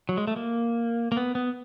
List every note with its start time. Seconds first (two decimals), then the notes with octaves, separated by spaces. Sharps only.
0.09 F#3
0.17 G#3
0.27 A3
0.36 A#3
1.12 A#3
1.17 B3
1.35 B3